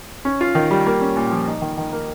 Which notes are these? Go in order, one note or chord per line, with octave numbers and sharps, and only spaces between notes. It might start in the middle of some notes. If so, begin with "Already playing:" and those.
C#4
F4
D#3
G3
A#3
C#4
A#2
F3
D#4
D#3
D#3
A#3